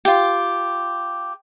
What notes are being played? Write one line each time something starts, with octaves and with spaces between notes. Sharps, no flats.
F4 G4